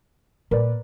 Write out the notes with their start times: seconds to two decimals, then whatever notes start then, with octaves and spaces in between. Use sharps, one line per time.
0.51 A#2 A#4 B4 D5